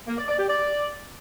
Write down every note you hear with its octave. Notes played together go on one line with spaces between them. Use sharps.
A#3
D5
D5
G4
D5